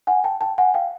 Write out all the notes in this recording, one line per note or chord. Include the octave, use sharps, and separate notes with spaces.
F#5 G#5
G5 A5
G5 A5
F#5 G#5
F5 G5